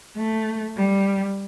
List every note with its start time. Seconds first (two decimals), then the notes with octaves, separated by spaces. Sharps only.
0.16 A3
0.76 G3